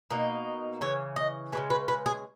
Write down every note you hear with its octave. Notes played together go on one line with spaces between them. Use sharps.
B2 A#3 D#4
C#3 E3 C#5
D#5
C#3 E3 G#3 B4
B4
B4
G#4